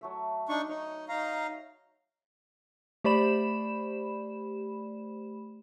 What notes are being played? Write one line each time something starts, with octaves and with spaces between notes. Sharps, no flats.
F#3 A3 E5
D4 D#4 C#6
D#4 C#5
D#4 F5 A#5
A3 G4 C5 D5 B5 E7